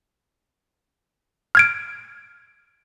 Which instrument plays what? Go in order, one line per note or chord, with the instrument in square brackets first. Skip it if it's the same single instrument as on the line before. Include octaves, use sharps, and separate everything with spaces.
[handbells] F6 G#6 D7